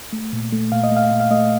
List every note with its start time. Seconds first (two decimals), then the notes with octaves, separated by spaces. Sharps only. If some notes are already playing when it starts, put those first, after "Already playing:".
0.13 A3
0.33 A#2
0.53 A3
0.72 A#2 F5
0.84 D#5
0.91 A3
0.96 F5
1.11 A#2
1.20 F5
1.30 A3 D#5